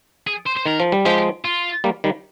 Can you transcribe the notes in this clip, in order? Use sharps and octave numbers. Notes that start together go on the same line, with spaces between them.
G#4
C5
C5
D#3 A#4
F3
G3
F3 G#3 G4
F4
G3 A#3
D#3 G3